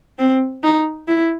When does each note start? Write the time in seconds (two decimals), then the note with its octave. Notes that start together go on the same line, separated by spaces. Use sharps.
0.19 C4
0.63 D#4
1.08 E4